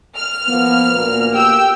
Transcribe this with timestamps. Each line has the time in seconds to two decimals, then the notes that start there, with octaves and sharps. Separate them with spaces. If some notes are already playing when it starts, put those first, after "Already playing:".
0.16 F6
0.48 F3 A#3 B3
0.92 D2 A#2 A#3
1.32 G4 G5 E6